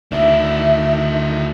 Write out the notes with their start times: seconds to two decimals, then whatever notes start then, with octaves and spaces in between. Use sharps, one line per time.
0.12 D2 D3 D#3 D4 E4 E5